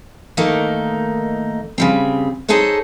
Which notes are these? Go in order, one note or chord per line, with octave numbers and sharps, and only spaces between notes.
D#3 A3 A#3 D#4
C#3 G3 C4
D#4 G#4 A4 C5 C#5